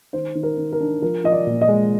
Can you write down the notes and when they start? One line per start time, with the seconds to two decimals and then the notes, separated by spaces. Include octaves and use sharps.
0.13 D#3 C5
0.35 D#3
0.43 A#4
0.58 D#3
0.72 A#4
0.80 D4
1.02 F3 A#4
1.24 F3 D#5
1.32 D5
1.47 A#2
1.61 D#5
1.68 G#3